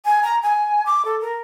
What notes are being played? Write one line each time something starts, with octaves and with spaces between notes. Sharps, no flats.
G#5
A#5
G#5
D6
A4
A#4